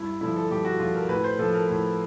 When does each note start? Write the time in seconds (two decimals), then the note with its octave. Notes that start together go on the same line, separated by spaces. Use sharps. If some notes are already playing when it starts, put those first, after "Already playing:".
Already playing: G2 E4
0.21 D3 F3 E4
0.37 A4
0.51 G2 G4
0.65 F#4
0.79 D3 F3 F4
0.95 A#4
1.09 A2 B4
1.24 C5
1.39 F3 A4
1.54 A#4
1.69 A2